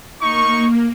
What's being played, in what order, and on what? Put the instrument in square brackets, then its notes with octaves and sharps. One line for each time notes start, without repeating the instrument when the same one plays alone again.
[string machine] A#3 [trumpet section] D#4 C#6